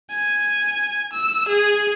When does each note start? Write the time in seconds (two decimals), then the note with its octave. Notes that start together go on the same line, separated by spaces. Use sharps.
0.11 G#5
1.13 E6
1.48 G#4